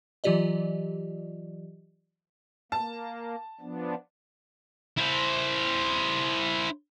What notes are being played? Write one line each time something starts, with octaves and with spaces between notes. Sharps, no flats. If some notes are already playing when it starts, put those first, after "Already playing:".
E3 F#3 F4 G4 D5 D#5
A#3 A5
F3 B3 D4
E4 C5